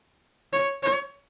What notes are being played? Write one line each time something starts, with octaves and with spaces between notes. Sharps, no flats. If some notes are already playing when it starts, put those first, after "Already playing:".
C#5
C#5